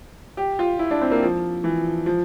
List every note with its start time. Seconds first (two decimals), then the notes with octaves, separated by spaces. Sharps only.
0.37 G4
0.59 F4
0.79 E4
0.91 D4
1.01 C4
1.11 A#3
1.23 F3
1.64 E3
2.06 F3